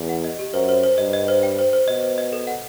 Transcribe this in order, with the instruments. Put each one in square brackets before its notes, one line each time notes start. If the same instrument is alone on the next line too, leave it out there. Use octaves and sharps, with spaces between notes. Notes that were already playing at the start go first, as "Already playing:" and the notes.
Already playing: [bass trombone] E2
[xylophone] F#5
D#5
G4
[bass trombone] F#2 [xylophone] C5
[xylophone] C5
C5
[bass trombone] G2 [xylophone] D#5
[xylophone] D#5
C5
G5
C5
C5
[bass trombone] B2 [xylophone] D#5
[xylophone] C5
D#5
A4
F#5